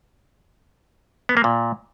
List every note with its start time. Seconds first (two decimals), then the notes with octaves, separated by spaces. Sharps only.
1.29 B3
1.37 A#3
1.44 A#2